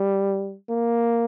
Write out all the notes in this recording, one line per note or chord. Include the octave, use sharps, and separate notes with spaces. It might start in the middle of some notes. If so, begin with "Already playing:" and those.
Already playing: G3
A#3